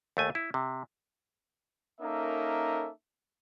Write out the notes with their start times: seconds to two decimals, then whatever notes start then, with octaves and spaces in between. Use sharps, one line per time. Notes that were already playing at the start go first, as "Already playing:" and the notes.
0.17 D#2 A3 G#5
0.35 E4
0.54 C3
2.01 A#3 C#4 D#4 A4 A#4 E5